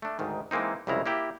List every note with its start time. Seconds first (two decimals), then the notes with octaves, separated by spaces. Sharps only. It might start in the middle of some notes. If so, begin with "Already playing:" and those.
0.02 A3 D4
0.19 D2 G#2 D#3
0.51 E3 G#3 A#3 C4 D#4
0.87 C2 F2 C#3 G#3 E4 A#5
1.06 A#3 E4 G4